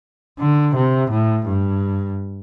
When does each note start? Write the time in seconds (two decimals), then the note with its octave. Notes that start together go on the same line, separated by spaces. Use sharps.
0.39 D3
0.75 C3
1.11 A2
1.46 G2